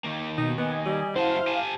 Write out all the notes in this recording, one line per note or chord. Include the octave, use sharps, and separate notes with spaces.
D#3 A#3
B2 D#4
B3 D#5 G#5
G3
F#2 E4 F#4 C5 F5 A5
G4 G#5 A5